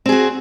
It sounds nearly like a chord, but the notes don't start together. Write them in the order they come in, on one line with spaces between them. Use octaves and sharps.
C4 G#4 F#4